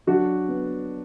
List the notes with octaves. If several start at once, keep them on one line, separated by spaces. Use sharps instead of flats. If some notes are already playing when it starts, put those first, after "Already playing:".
F#3 D4 F#4
B3